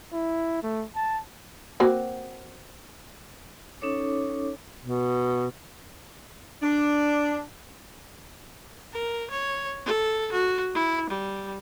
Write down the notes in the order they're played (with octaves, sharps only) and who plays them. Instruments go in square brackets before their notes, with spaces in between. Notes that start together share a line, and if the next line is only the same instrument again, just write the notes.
[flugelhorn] E4
A3
A5
[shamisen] A#3 C4 F#4
[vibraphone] C#4 D#4 A4 C#5 D6
[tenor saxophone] B2
[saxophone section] D4
[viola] A#4
C#5
A4
F#4
E4
G3